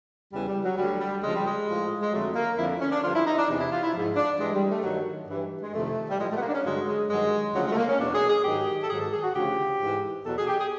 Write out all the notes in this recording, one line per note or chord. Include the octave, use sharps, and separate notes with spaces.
E2 C#3 E3 G3
G3
F#3
D2 D3 F#3 G3
G3
D2 C#3 F3 G#3
G3
G#3
A2 F3
G#3
F2 D3 F#3 A3
A#3
F2 D3 F3 E4
C#4
D4
G2 D3 F3 F4
E4
D#4
D4
E2 C3 E3 D#4
E4
F4
E4
G#2 F3
D4
G2 E3 G#3
G3
A3
G2 D#3 F#3
G2 E3
G#3
F2 C3 D#3 A3
G3
A2 F3 G#3
A3
B3
A#3
D4
C#4
G2 D3 F#3 G#3
G#3
G2 D#3 F#3 G#3
D2 C#3 F3 F#3
G#3
A3
A#3
C#4
E2 B2 F#3 D4
G#4
G#4
G#2 D#3 F#3 G4
A4
G#2 D#3 F#3 G#4
A4
G#4
F#4
D2 C#3 F3 G4
G#2 E3
E2 B2 F#3 A4
G#4
G4
G#4